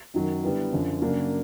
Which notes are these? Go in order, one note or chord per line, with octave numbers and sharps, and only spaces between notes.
F#2 D#3 F#3
D3 G3 B3 E4
F#2 D3 F3
F#2 C#3 F#3 A#3 D4